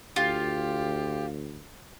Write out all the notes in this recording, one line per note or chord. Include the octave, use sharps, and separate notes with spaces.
D2 F4 G4